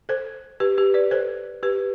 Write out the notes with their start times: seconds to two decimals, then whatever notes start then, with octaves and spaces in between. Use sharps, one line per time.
0.09 A4 C5
0.60 G4 B4
0.78 G4 B4
0.94 B4 D5
1.11 A4 C5
1.63 G4 B4